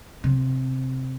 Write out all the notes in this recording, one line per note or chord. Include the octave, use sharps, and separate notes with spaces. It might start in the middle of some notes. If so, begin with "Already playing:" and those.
C3